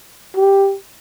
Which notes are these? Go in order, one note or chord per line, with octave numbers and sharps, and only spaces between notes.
G4